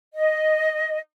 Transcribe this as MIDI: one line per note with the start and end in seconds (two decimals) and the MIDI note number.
0.14 0.98 75